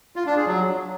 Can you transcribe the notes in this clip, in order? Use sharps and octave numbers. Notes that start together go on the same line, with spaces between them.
F4
D4
G#4
F#3